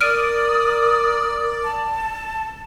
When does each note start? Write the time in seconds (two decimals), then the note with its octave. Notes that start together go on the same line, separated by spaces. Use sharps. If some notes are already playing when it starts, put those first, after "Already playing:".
0.01 A#4 D5 D#6 F6 D7 D#7
1.64 A5